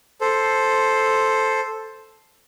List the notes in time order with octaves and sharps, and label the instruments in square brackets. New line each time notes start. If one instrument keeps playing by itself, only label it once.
[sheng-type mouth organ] A4 C5